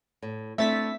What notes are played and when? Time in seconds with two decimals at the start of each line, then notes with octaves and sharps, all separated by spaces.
0.22 A2
0.58 A3 C4 D4 E4 E5 A6 B6